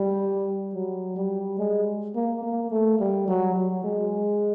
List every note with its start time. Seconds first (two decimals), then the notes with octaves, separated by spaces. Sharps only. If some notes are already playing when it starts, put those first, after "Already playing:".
Already playing: G3
0.74 F#3
1.16 G3
1.59 G#3
2.15 A#3
2.43 A#3
2.71 A3
2.99 G3
3.28 F#3
3.56 F#3
3.84 G#3